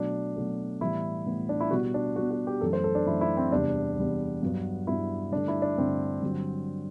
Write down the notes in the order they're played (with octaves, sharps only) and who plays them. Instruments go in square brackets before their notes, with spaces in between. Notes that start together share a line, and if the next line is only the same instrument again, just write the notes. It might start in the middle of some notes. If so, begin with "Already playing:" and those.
Already playing: [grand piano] B2 F#3 A3 D4
B2 F#3 A3
A2 E3 G3 B3 E4
A2 E3 G3 B3
D4
E4
B2 G3 B3 F#4
D4
B2 G3 B3 F#4
F#4
G4
F#2 E3 A3 A4
C5
A4
D4
F#2 E3 A3 E4
E4
C4
E2 C3 G3 B3 D4
E2 C3 G3 B3
G2 F#3 B3
G2 F#3 B3 E4
G2 D3 A3 D4
E4
D4
G2 D3 A3 C4
G2 D3 F#3